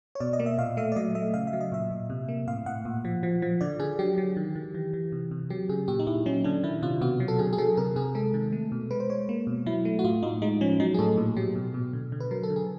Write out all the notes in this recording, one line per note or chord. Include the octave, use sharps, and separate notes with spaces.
C#5
B2 D5
D#5
A#3
E5
A#2 F5
A3 E5
D5
F#3 D#5
A3 E5
C#3 F5
E5
F#3
D#5
A#2 E5
A#2
C3
A#3
A2 F5
A2 F#5
A#2
F3
F3
F3
D3 D5
D3 G#4
F#3 G4
F#3
D#3
D#3
E3
E3
C3
C3
F#3 G4
C#3 G#4
A#2 G4
D#4
A#2 E4
F#3 C#4
D3 D4
D#3 E4
C3 F4
B2 F#4
F#3
A4
D3 G#4
G#4
F#3 A4
C3 A#4
C3 G#4
G#3 A4
D#3
A3
B2
G#3 B4
C5
G#3 C#5
A#3
B2
F#3 E4
A3
F#4
A2 F4
A2 D#4
G#3 D#4
F3 C#4
F#3 D#4
G#4
A2 A4
A#2
F#3 G4
B2
B2
D3
D3
B4
F#3 A#4
A4
D3
G#4